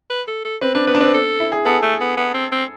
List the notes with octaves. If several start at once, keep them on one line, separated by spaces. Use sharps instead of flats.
B4
A4
A4
C4 B4
D4 B4
B3 B4
D4
C4 B4
A4
E4
G#4
B3 A4
A3
B3
B3
C4
C4